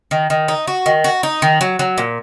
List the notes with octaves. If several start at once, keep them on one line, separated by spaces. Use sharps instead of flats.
D#3
D#3
D#4
F#4
D#3
F#4
D#4
D#3
F#3
F#3
A#2